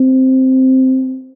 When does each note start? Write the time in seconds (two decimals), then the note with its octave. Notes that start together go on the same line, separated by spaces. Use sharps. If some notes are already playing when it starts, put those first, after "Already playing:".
Already playing: C4